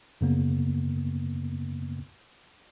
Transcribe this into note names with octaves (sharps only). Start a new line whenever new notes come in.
F#2 C#3 A#3 B3